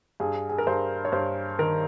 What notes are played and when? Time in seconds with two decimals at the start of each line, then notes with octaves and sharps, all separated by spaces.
0.20 G2 G#4
0.49 G#4
0.58 A#4
0.67 G2 C5
1.05 C#5
1.12 G2 C5
1.59 D#3 A#4